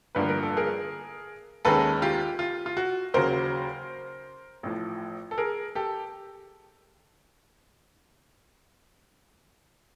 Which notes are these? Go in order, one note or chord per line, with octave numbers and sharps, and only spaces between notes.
A1 G2 D3 F3 A#3 B4
A#4
A4
G#4 A#4
D#2 D#3 G#3 C#4 A4 B4
F4 G4
F4
F4
F#4
D#2 C#3 F#3 A#4 C5
A1 A2 F3
A4
G#4 A#4
G4 A4